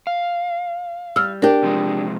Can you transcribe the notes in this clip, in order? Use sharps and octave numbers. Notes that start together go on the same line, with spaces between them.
F5
G3 E6 F6
D4 G4 A#4
C3 F3 G#3